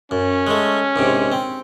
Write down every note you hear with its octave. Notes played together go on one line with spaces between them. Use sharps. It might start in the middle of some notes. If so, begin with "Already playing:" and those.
F#2 C#4
G#3 A3
A#1 G#2 C3
C4